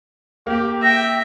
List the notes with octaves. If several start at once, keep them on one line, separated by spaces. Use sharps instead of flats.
A#3 G4
E5 G5 A#6